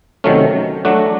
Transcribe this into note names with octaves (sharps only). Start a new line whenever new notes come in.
C3 D#3 F#3 A3 C#4
F#3 A3 D4 F#4